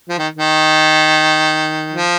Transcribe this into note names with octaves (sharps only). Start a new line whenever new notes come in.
F3
D#3
D#3
F3